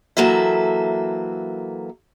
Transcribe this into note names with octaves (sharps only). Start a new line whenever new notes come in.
E3 F#3 A#3 A4 E5